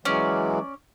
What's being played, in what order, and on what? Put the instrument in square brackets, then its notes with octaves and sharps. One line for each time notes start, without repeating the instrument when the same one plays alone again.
[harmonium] E3 F#3 G#3 [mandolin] C#4 D5